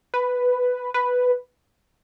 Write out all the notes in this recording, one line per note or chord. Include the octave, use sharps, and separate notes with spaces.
B4
B4